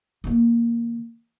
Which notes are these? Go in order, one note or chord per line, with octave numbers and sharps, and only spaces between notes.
D#3 A#3